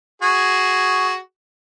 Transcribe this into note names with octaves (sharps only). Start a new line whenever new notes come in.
F#4 G#4